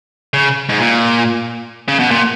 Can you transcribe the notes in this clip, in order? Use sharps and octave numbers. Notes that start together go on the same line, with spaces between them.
C#3
G#2
A#2
C#3
B2
A#2